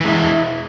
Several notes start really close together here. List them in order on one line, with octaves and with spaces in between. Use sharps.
E3 G#3 E4